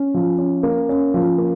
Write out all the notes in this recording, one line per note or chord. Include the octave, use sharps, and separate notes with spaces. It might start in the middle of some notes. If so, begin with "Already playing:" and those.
Already playing: C#4
F3
C#4
A#3
C#4
F3
A#3